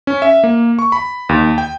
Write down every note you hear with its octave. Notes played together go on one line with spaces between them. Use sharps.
C#4
E5
A#3
C#6
B5
D#2
G5